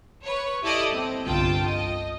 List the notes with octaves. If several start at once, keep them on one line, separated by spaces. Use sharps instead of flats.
B4 C#5
E4 G4 A4 D5 D#5
C4
G1 C2 F4 G5 A5
D#5